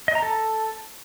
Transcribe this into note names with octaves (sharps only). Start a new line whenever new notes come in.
D#5
A#5
A4